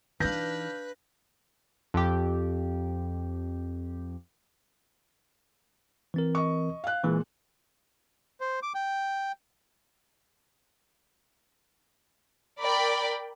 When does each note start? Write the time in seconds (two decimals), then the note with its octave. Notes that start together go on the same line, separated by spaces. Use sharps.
0.20 E3 D4 D#4 B4 F5 G6 A#6
1.94 F2 G4
6.14 E3 C4 A#4
6.35 D#5 C#6
6.84 F5 F#6
7.04 A#2 E3 G#3
8.40 C5
8.63 D6
8.75 G5
12.60 A#4 D5 G5 B5